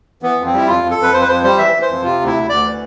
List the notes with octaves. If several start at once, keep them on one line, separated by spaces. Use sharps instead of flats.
E3 B3
F2
C4
G3 E4
F2 F4
F2
A4
F2 B4
F2 C5
B4
F2 C5
G3 C5
E3 E5
E3
C5
F2
C3 F4
D2
E4
D2
D2 D5
E3